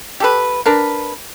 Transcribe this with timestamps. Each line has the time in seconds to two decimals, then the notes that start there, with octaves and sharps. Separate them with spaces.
0.20 G4 A4 B4
0.66 D4 A#4 B4